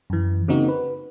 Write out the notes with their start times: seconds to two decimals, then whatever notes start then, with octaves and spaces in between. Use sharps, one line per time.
0.10 F#2 E3
0.48 C#3 A#3 C4 D#4 F#4
0.69 B4